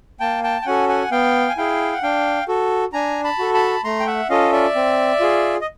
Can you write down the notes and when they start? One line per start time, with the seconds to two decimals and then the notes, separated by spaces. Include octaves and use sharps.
0.20 A#3 G5 A5
0.44 G5 A5
0.62 G5
0.66 C#4 F#4 A4 F#5 G#5
0.89 F#5 G#5
1.11 B3 F5 G5
1.49 G#5
1.57 E4 G#4 F5 G5
1.93 F#5
2.03 D4 F5 G5
2.48 F#4 A4
2.93 D4 G#5 A#5
3.24 A5 B5
3.39 F#4 A4
3.54 A5 B5
3.84 A3 A#5 C6
4.00 G5
4.07 E5 F#5
4.29 C#4 F4 A4 D#5 F5
4.52 D5 E5
4.75 C4
5.20 F4 G#4
5.61 D#5